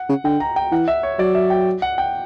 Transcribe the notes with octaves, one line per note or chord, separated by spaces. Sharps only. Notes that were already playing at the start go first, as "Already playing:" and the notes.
Already playing: F#5
C#3
D3 G5
A#5
G5
E3 F#5
E5
C#5
F#3 D5
E5
G5
F#5
G5